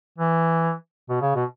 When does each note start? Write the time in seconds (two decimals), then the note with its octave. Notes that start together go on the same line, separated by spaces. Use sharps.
0.18 E3
1.09 B2
1.22 C#3
1.35 B2